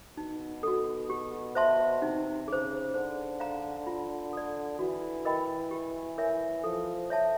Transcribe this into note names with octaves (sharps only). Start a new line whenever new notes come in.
B2 D#4
F#4 A4
G4
C5 E5 A5 C6
C3 D#4
C#3 G#4 C5
D3 C5
F5 A#5
F4
A4 D5
E3 F#4
A#4 D#5 G5 B5
G4
A#4 C#5 E5 G#5
F3 A4
C#5 E5 A5